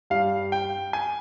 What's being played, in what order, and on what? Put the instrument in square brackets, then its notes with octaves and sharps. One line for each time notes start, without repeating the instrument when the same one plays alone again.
[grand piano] G2 G3 F5
G5
G#5